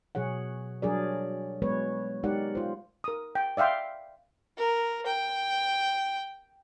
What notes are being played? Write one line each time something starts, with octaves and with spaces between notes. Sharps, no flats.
B2 F#3 G#4 C#5 F#5
F#3 G3 D4 G#4 A#4 D5
F#3 G#3 B3 B4 C#5
G#3 D#4 G4 A#4 D5 F#5
F4 C5
A#4 D#6
G5
D5 E5 F5 G5 C6
A#4
G5